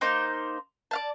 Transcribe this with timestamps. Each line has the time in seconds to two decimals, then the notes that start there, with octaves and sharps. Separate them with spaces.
0.01 A#3 D#4 C5
0.91 D5 F5 A5